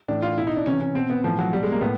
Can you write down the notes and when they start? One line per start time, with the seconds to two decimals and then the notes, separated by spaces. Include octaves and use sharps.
0.08 A2 E3 D4
0.22 F4
0.38 B2 E4
0.47 D#4
0.57 D4
0.66 C3 E3 C#4
0.81 C#4
0.94 B2 C4
1.10 B3
1.24 A2 E3 F3
1.39 F#3
1.53 B2 G3
1.63 G#3
1.72 A#3
1.81 A2 B3